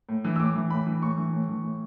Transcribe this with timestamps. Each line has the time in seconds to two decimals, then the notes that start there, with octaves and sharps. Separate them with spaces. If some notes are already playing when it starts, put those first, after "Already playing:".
0.09 A2
0.25 E3
0.36 E6
0.40 A2 D6
0.55 E3
0.70 A2 B5
0.86 E3
1.02 A2 C#6
1.17 E3
1.33 A2
1.49 E3
1.64 A2